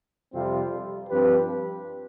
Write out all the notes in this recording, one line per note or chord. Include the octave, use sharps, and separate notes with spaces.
F2 C3 G3 C4 F4
G2 F3 C4 G4 B4